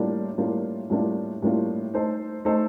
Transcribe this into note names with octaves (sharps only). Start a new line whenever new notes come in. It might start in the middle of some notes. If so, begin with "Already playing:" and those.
Already playing: A2 G3 A#3 D4 F4
A2 G3 A#3 D4 F4
A2 G3 A#3 D4 F4
A2 G3 A#3 D4 F4
A3 D#4 A4 C5
A3 D#4 A4 C5